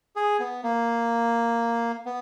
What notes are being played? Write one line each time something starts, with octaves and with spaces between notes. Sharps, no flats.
G#4
B3
A#3
B3